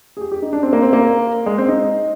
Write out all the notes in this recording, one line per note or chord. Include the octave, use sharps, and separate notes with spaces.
G#4
G4
G4
D#4
D4
C4
A#3
C4
A#3
G#3
C4
D#4